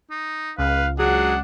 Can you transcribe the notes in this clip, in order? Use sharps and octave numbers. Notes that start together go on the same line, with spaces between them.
D#4
C#2 B4 F5
F#3 D4 G#4 F#5